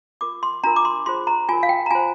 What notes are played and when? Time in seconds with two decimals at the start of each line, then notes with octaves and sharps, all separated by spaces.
0.21 F4 A#4 D6
0.43 C6
0.64 D4 F4 A#4 A#5
0.76 D6
0.85 C6
1.06 F4 G#4 C5 C6
1.27 A#5
1.49 F4 A#4 G#5
1.63 F5
1.69 G5
1.86 A#5
1.91 F4 C5 G#5